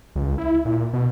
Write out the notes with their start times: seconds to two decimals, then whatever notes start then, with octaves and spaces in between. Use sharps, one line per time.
0.16 C#2
0.38 E4
0.65 A#2
0.93 B2